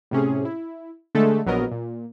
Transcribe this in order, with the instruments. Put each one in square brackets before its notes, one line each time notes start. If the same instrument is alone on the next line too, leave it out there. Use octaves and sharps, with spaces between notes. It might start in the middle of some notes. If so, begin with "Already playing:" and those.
[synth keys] A2 C3 C#4 G#4
E4
D3 G#3 A3 A4
A#1 F#3 B3 A#4 D#5
A#2